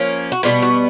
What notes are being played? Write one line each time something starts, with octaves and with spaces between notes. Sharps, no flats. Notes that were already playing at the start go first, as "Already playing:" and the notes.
Already playing: F3 A#3 C#4
F#4
B2 G3 B3 F4
F#4